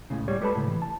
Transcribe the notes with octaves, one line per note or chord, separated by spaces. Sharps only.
C#2 A2 C#3
G3 C#5
G#3 G4 A4 B4 A5 B5
A2 C#3
E3
A5